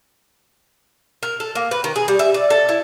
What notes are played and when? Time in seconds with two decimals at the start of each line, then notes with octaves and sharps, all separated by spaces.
1.23 A#4
1.40 A4
1.55 A#3
1.71 B4
1.84 D#3
1.96 G#4
2.08 G3
2.19 E5
2.34 D5
2.50 A4
2.69 E4